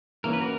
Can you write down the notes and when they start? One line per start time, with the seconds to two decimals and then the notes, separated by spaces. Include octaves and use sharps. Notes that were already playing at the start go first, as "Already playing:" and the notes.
0.24 E3 A#3 C#4 A#4
0.33 B4
0.41 F#4 A#4